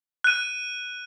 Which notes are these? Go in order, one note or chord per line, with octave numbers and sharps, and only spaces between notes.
F#6 D#7